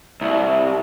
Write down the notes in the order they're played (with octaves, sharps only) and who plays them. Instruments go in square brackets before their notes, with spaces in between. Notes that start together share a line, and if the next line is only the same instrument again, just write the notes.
[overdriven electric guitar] C2